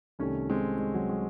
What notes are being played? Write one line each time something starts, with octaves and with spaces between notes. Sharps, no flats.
C2 C3 D#3 A3 C#4
G#3 C4
G#3
F#3
G#3